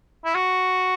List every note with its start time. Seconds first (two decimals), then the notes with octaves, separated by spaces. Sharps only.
0.25 E4
0.35 F#4